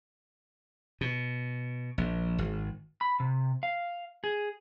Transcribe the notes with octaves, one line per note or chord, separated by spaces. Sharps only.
B2
A#1
G#1
B5
C3
F5
G#4